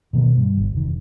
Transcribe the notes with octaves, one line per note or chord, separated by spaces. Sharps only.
B2 D#3 A#3
G2
G1
F1 D#3